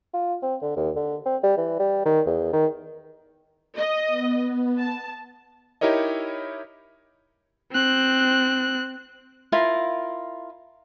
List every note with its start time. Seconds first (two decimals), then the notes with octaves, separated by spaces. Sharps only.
0.14 F4
0.42 C4
0.62 D3
0.76 D#2
0.96 D3
1.25 C4
1.43 G3
1.57 E3
1.79 G3
2.05 D#3
2.26 E2
2.53 D#3
3.77 D#5
4.07 B3
4.78 A5
5.81 D#4 E4 G4 A#4 C#5 D#5
7.72 C4 F#6
9.52 E4 F4 A#4 F5